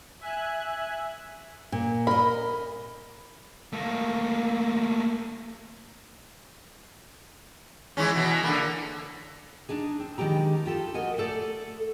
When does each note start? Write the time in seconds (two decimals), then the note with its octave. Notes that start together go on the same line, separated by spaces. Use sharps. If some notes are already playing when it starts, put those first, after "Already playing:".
0.21 E5 G#5 F#6
1.72 A#2
2.07 A#4 D#5 B5
3.73 A3 A#3
7.97 E3 G#3 C#4
8.16 B2 E3
8.43 D3 A#3
9.69 D4 D#4 G#4
9.99 C4
10.18 D#3 G#3 D4 G4 A#5
10.66 F4 G4 A4
10.94 F#4 A#4 D#5 F#5 G#5
11.18 A3 A4 D5